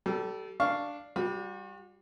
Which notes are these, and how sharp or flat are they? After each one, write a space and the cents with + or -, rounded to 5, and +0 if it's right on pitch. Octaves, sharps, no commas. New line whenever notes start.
G3 -30 A4 +0
D4 +0 F5 +0 C#6 +0
G3 +0 F#4 -40